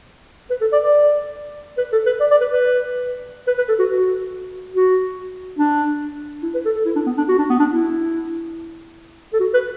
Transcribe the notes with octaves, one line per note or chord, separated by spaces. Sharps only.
B4
A4
D5
D5
B4
A4
B4
D5
D5
B4
B4
B4
B4
A4
F#4
F#4
F#4
D4
E4
B4
A4
A4
E4
D4
B3
D4
F#4
D4
B3
D4
E4
A4
F#4
B4